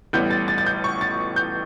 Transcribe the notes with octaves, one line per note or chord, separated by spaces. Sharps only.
A1 A2 G3 B3 G6
A6
A6
A6
G6
C#6
A6
G6